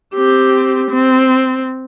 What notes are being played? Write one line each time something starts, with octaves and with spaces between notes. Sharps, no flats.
C4 G4
C4